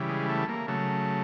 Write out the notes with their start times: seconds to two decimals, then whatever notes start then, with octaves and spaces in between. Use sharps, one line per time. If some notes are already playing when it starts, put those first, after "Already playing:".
Already playing: C#3 E3 G3
0.09 G#3
0.29 A3
0.49 A#3
0.68 C#3 F#3 A3